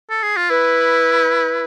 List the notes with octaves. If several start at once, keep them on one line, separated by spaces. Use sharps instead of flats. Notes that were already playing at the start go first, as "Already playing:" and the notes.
A4
G#4
F4
E4 B4